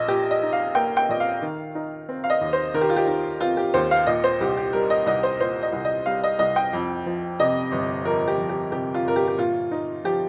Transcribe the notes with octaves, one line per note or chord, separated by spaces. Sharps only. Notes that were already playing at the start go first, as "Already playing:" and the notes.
Already playing: A#1 D#5
A#2 G4
D#5
D#4
F5
A#3 G5
G5
A#1 D#5
F5
D#3
D#4
C4
F5
D#5
D#2
C5
D#3 A#4
G4
F4
G4
D#4
C4 F4
G4
D#2 C5
F5
A#2 D#5
C5
C2 G4
G4
G3 A#4
D#5
C2 D#5
C5
A#2 C5
D#5
C2
D#5
G3 F5
D#5
C2 D#5
G5
F2
F3
C3 D#5
G1
F2 A#4
G4
F3
G4
C3 G4
F4
G1 A#4
G4
G4
A#2 F4
D#4
F3 G4